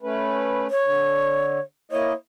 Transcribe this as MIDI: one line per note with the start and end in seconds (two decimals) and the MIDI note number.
0.03 0.67 57
0.03 0.67 61
0.03 0.67 71
0.71 1.60 73
0.83 1.59 50
1.91 2.13 58
1.91 2.13 64
1.91 2.12 73
1.91 2.13 75